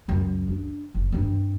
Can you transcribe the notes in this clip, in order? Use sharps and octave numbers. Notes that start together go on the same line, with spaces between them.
C#2 F#2
D4
F#1
G2 C4